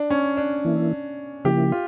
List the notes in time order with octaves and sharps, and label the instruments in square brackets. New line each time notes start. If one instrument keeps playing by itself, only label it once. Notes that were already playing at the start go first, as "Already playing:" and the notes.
Already playing: [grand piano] D4
C#4
D4
[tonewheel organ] E3 A#3 E4
[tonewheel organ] C#3 F3 A#3 E4 [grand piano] G4
[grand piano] F4